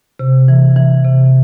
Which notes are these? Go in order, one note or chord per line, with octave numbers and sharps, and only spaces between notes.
C3
E3
E3
C3